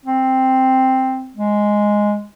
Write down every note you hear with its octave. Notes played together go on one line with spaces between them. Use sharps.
C4
G#3